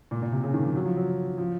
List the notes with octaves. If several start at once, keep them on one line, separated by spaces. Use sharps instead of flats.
A#2
A#2
C3
C#3
D#3
F3
F#3
F3
F#3
F3